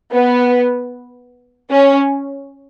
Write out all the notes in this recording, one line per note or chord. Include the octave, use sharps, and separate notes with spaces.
B3
C#4